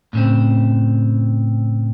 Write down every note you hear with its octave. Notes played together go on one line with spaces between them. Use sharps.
A2 C#3 C4